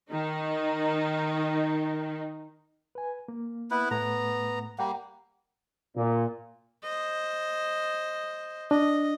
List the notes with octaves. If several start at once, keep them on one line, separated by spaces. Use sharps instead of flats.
D#3 D#4
B4 G#5
A#3
B3 E4 B4
A2 A3 B3 A#5
G3 A#3 F#5 G5 A#5
A#2
C5 D#5
D4 D#5